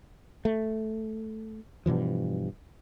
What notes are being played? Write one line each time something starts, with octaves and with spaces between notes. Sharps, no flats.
A3
G2 B2 E3 F3